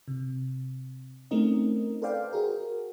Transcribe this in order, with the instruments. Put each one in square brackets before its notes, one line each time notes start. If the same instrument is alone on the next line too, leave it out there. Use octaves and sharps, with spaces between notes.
[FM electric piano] C3
A3 C4 C#4 D#4 A#4 D#5
A4 B4 C5 D5 F5 G5
F#4 G#4 A#4